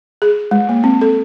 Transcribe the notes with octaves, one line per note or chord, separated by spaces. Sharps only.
G#4
G#3
A#3
C4
A4